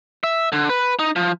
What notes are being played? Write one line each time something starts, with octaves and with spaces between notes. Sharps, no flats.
E5
D3
B4
D#4
F3